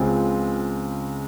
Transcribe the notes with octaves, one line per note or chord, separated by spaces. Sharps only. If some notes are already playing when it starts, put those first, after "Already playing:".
Already playing: C#2 C#3 G#3 C4 F4